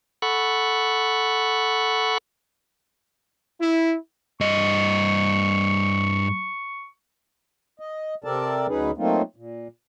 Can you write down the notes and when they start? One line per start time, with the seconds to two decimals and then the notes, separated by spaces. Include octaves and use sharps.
0.22 A4 F#5 B5 C#6
3.60 E4
4.41 G2 D#5 C#6
7.80 D#5
8.24 C3 C4 A4 A#4 D5 A5
8.68 D2 F#3 C#4 D#4 G#4 B4
8.98 F#3 A3 A#3 C4 D#4 F4
9.36 A#2